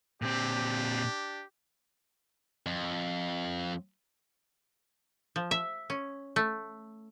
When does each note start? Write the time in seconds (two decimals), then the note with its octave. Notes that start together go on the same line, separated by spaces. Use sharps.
0.22 A#2 C4 D4 G4
2.66 F2
5.36 F3
5.51 E5
5.90 C#4
6.36 A3